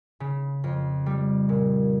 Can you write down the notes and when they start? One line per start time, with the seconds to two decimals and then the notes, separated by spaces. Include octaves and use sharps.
0.20 C#3
0.64 F2
1.06 G3
1.49 A#2